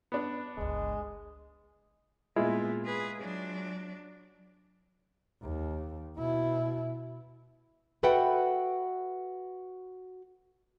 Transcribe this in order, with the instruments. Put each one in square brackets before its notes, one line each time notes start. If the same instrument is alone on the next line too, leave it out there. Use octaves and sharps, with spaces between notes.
[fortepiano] B3 D4
[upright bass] G1 C#2 [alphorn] G#3
[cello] A#2 B3 [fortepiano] G#3 E4 F4
[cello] G#4 B4
F#3 D4
[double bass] D#2
B2 E4
[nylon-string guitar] F#4 A4 B4 E5 F#5 G5